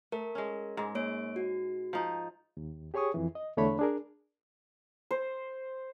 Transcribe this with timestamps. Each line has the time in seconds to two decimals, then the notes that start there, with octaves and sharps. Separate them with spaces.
0.12 A3 A#4
0.35 G#3 C#4
0.77 G#2 G#3
0.95 A#3 C#5 D7
1.36 F#4
1.93 F3 D#4
2.57 D#2
2.94 G4 G#4 C#5 G#5 C#6 D#6
3.14 F2 E3
3.35 D#5
3.57 E2 D3 A3 D4 C#5 B5
3.79 D4 G#4 A#4
5.11 C5